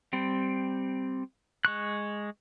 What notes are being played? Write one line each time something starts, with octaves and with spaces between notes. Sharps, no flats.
G3 C4
G#3 C#6 F#6